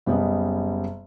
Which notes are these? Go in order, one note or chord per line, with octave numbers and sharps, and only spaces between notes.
F#1 G3 B3 C#4 D#5